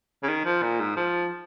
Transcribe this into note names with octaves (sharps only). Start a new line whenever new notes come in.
C#3
D#3
F3
A#2
G#2
F3